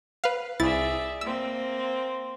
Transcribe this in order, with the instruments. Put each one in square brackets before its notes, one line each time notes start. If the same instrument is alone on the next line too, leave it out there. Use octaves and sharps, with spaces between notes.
[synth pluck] B4 F5
[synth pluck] C2 E4 A6 [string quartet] G#4 D5 E5
[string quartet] A#3 C4 [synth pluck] E6